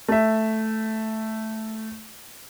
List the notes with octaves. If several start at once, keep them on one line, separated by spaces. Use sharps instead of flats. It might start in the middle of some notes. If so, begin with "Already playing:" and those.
A3 E5